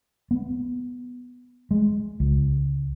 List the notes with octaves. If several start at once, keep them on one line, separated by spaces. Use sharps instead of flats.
B3
G#3
C#2